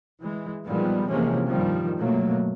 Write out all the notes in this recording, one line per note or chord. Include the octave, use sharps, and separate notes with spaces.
E3 G#3
A#2 D#3 F3 G3 G#3 B3
C3 E3 F3 G#3 A#3 C#4
G2 D#3 F3 G3
B2 F#3 A3 A#3